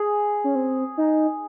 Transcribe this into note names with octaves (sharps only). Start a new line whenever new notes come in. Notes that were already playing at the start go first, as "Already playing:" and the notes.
Already playing: G#4
C#4
C4
D#4